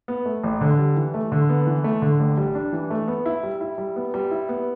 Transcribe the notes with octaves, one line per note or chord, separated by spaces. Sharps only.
B3
A3
A1
D3
G3
E3
A3
D3
B3
E3
A3
D3
A1
G3
D4
E3
A3
B3
E4
G3
E4
G3
B3
G3
E4
B3